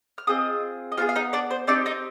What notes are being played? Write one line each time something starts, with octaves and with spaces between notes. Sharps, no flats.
F6
C4 F4 G#4 D#5 D#6
D#5
B3 D#4 F4 G#4 F5
F5
D#4 D#5
D4 D5
C5
C4 D4 D#4 G4 D5
D#4 D#5